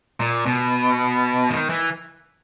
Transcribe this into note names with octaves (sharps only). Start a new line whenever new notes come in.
A#2
B2
D#3
E3